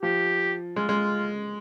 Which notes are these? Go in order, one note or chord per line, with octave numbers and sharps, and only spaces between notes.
F3 G4
G#3 F4
G#3